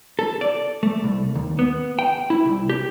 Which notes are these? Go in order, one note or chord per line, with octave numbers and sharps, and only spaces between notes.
A4
D5
A3
C2
D#2
B3
G5
E4
C2
G4